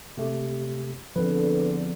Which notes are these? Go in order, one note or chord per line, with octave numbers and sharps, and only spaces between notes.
C3 A3 G4
E2 D3 F3 C4 B4